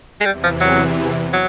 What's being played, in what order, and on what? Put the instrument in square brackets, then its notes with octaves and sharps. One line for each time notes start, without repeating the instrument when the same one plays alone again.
[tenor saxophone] G#3
[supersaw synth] E2 C3 E3 [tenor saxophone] G3
[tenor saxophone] F3
F#3
F#3